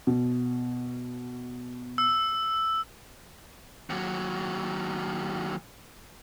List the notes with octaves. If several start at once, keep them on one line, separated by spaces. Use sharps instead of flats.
B2
E6
D#2 F#3